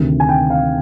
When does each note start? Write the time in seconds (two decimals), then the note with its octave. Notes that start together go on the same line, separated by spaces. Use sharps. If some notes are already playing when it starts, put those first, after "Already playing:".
Already playing: D2 C3 D#3
0.20 G#5
0.29 G5
0.50 F5